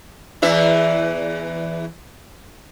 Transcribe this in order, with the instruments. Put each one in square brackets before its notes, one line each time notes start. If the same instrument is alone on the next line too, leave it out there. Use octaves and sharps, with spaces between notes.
[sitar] E2 E3 E5